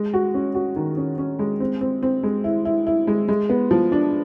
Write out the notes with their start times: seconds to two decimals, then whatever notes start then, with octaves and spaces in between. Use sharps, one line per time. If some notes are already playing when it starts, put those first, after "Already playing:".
Already playing: G#3
0.14 F#4
0.34 C#4
0.55 F#4
0.76 D#3
0.97 C#4
1.18 C#4
1.39 G#3
1.60 C4
1.81 C4
2.03 C4
2.23 G#3
2.44 E4
2.65 E4
2.87 E4
3.07 G#3
3.28 G#3
3.49 B3
3.71 F3
3.92 D4